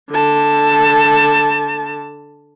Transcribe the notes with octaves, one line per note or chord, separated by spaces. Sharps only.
D3 A5